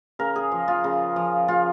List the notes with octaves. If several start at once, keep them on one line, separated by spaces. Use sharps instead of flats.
C#3 A#4
G#4
F3
F4
C#3
F3
C#3 F4